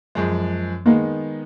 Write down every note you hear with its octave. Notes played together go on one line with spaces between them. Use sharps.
F#2 F3 G#3
D#3 G#3 A#3 B3 D#4